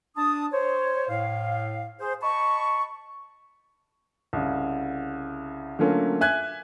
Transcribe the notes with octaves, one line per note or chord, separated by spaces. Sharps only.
D4 A5 D#6
C5 C#5
A2 F5
G#4 C5
D#5 A5 B5 C#6
C2 C#3
D3 F#3 A3 A#3 C#4 F4
E5 G#5 F#6 G#6